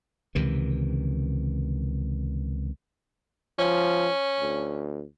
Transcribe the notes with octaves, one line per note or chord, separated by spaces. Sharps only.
C#2 C3 D#3 E3
F3 C#4
D2